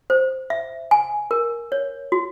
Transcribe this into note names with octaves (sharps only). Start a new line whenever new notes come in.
C5
E5
G#5
A#4
C#5
F#4